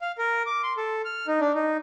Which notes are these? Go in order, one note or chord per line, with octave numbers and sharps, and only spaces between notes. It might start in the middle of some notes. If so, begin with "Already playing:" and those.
F5
A#4
D6
C6
A4
F6
D#4
D4
D#4